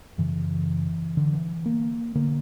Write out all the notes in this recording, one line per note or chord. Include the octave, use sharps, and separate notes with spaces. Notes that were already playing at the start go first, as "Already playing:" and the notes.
F#2 C#3 E3
D3
E3
A#3
D3 A#3